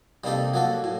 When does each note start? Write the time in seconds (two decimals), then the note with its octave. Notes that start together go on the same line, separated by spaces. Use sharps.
0.24 C3 G3 A#3 D#4 A4
0.54 F#3 A#3 F#4 A4
0.84 A2